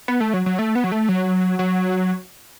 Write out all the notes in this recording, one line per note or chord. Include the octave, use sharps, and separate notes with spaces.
B3
A3
F#3
F#3
A3
B3
F#3
A3
F#3
F#3